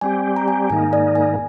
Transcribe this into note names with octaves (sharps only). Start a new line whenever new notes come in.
G3 C4 G4 G#5
A#5
G#5
G#2 D#3 A#3 D#4 G#5
D5
G#5